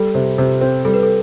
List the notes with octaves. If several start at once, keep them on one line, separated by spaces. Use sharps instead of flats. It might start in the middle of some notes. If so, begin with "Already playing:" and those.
Already playing: G3 A4
C3
C3
C4
G3 A4
B4
A4